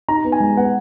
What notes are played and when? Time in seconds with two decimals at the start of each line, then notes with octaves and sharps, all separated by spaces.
0.08 D#4 A#5
0.25 B3
0.32 G#5
0.40 G#3
0.57 B3 F#5